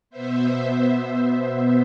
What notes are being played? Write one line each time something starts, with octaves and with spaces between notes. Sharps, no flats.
B2 B3 C5 E5